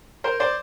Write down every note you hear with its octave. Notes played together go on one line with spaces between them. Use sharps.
A#4 C5
C5 D5